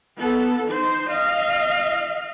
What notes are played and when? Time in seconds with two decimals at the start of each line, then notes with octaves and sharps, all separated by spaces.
0.17 B3 A4
0.68 D#4 C5
1.09 D#5 F5